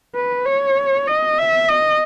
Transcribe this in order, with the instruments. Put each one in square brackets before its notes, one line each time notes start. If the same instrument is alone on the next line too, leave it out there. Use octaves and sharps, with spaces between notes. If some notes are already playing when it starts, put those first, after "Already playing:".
[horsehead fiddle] B4
C#5
D#5
E5
D#5